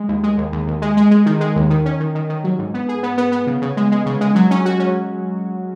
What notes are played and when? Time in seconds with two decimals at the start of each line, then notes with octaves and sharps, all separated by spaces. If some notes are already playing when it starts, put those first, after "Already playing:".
Already playing: G#3
0.08 D#2
0.23 G#3
0.38 D#2
0.52 D#2
0.67 D#2
0.82 G#3
0.97 G#3
1.11 G#3
1.26 D#3
1.40 G#3
1.56 D#2
1.70 D#3
1.86 C#4
2.00 D#3
2.15 D#3
2.29 D#3
2.44 F#3
2.59 G#2
2.74 B3
2.89 G#4
3.03 B3
3.18 B3
3.32 B3
3.47 C#3
3.62 C#3
3.77 G#3
3.92 G#3
4.06 C#3
4.21 G#3
4.35 F#3
4.51 C#4
4.65 F#4
4.79 C#4